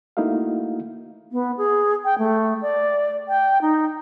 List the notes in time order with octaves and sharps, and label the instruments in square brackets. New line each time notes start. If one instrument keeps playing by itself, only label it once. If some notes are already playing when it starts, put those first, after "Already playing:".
[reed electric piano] A3 A#3 D#4 E4 F#4 F5
[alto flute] B3
G#4
G5
A3
D5
G5
D#4